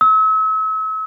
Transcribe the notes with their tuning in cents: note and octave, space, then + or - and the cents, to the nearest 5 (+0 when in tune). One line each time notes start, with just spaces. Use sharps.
E6 -40